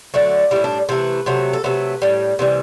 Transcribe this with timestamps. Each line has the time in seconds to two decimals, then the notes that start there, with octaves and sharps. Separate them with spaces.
0.14 D3 F#3 A3 D5
0.51 A2 G3 E4
0.64 D4
0.89 C3 E3 A3 B4
1.26 C3 F#3 A3
1.53 A4
1.64 C3 F#3 A3 B4
2.02 A2 G3
2.39 C3 E3 G3